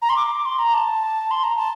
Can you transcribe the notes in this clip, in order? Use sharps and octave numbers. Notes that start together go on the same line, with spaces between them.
A#5
C6
D6
C6
A#5
A5
C6
A#5
A5